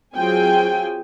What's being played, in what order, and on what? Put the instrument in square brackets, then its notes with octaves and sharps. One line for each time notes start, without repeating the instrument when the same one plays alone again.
[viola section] F#3 C4 F4 G#4 G5 G#5